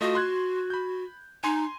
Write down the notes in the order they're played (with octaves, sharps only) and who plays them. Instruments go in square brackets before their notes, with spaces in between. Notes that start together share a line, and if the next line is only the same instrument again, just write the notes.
[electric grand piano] A3 F4 D#5 [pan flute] F#4
[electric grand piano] C6 F#6 G#6
B5 G6
[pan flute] D#4 [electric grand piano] G#5 A#5 C6